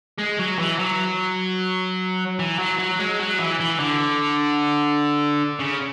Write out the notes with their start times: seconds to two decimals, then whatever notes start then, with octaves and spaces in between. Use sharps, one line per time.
0.19 G#3
0.40 F#3
0.59 E3
0.80 F#3
2.39 E3
2.59 F#3
2.79 F#3
3.00 G#3
3.20 F#3
3.40 E3
3.60 E3
3.80 D3
5.59 C#3